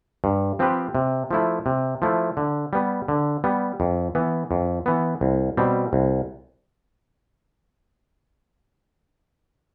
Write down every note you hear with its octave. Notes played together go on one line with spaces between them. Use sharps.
G2
F3 C4 G4 B4
C3
F3 A3 E4
C3
F3 A3 E4
D3
G3 B3
D3
G3 B3
F2
E3 B3
F2
E3 B3
C2
B2 G3 C4
C2